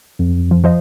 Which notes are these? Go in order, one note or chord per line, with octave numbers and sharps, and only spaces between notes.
F2
F3
F3 C5 D#5